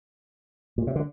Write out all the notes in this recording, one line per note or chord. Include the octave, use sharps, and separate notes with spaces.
A#2
C3
D3